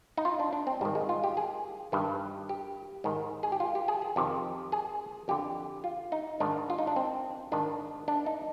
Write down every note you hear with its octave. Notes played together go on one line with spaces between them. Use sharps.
D#4
F4
D4
D4
C4
G#2 D#3 G3
G#3
F4
G4
G#4
G2 D#3
G4
G#2 D#3
G#4
G4
F4
G4
G#4
G#4
F2 C3 D#3 G4
G#4
F2 D3 G4
F4
D#4
G#2 D#3 D4
F4
D#4
D4
C4
G#2 D#3 D4
D4
D#4